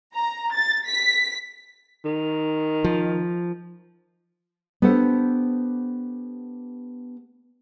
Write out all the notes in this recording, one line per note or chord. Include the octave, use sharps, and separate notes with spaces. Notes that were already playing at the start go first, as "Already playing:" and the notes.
A#5
A6
B6
D#3
F3
B3 D4 G4 A4 C5 F#5